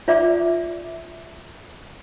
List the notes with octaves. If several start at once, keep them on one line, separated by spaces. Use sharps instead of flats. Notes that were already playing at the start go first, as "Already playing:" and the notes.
F4 D5 E5 D6